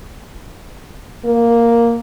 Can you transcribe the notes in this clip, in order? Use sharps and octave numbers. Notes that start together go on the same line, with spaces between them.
A#3